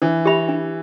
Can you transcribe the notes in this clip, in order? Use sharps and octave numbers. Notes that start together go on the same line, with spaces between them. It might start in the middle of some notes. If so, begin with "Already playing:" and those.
E3 D4
G4 E5 B5
D4